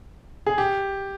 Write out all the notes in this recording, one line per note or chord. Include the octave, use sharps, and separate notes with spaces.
G#4
G4